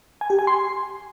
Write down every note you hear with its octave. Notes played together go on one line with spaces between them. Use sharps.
G#5
G4
G#5
C6